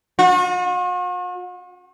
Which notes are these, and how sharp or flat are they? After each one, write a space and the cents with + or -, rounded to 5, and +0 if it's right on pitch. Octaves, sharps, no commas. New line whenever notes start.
F#4 -45